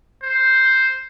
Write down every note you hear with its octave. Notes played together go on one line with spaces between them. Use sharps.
C5